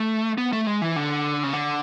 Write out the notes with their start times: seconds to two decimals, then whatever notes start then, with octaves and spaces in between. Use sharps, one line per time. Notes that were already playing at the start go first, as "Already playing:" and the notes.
Already playing: A3
0.38 B3
0.53 A3
0.67 G#3
0.82 E3
0.96 D3
1.43 C#3
1.53 D3